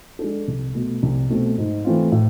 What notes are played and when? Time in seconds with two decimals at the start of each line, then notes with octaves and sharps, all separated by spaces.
0.19 G#3 D4 A4
0.48 C2
0.75 B2 A3
1.03 C2
1.29 B2 A3 C4
1.58 G#2
1.85 E3 A3 C4 F4
2.12 A2